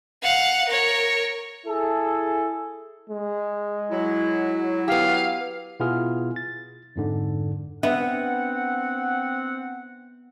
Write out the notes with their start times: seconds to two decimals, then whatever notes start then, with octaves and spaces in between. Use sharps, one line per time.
0.23 F5 F#5
0.68 A#4 C#5
1.67 E4 G#4 A4
3.09 G#3
3.91 F#3 E4
4.88 B3 G4 F5
5.80 B2 B3 E4 F4 G#4 F6
6.36 A6
6.96 F2 G#2 D3
7.83 B3 C4 D4 E5 F#5